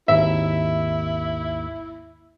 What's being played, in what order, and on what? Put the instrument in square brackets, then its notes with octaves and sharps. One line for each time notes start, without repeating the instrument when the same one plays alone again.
[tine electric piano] G#1 D#2 [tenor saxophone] E4 [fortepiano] E5